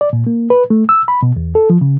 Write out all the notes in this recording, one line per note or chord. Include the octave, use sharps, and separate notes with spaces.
D5
A#2
A#3
B4
A3
E6
B5
B2
E2
A4
F3
C#3